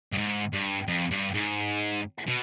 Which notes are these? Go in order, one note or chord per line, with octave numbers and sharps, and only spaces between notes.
G2
G#2
G2
F2
G2
G#2
B2